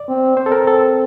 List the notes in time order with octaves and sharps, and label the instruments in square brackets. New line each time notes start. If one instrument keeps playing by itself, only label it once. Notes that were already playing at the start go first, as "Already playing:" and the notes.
Already playing: [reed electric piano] D5
[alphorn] C4
[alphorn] C4 [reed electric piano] C5
[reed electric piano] A4
A#4
A4